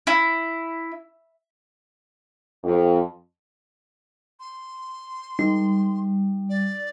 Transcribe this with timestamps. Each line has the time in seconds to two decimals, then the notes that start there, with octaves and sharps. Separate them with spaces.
0.07 E4
2.64 F2
4.40 C6
5.39 G3 D#4
6.50 D5